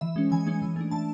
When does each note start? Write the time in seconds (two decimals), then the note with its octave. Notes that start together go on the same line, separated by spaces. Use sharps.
0.01 E3 E5
0.16 G#3 C#4
0.31 E3 G#5
0.47 G#3 C#4
0.62 E3
0.76 A3 D4
0.91 E3 A5